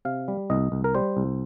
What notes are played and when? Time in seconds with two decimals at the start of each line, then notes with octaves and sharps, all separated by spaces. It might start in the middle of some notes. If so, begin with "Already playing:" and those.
0.05 C3 F5
0.28 G3
0.50 C2 D#5
0.72 C2
0.84 A#4
0.95 G3 C5
1.17 C2